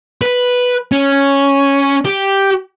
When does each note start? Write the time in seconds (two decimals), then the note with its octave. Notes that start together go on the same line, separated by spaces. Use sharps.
0.22 B4
0.92 C#4
2.05 G4